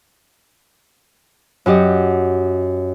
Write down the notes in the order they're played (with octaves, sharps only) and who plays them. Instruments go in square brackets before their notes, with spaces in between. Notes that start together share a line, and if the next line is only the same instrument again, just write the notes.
[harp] F#2 F#4 G4 D#5